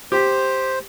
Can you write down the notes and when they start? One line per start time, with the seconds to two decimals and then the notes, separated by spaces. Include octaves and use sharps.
0.12 G4 C5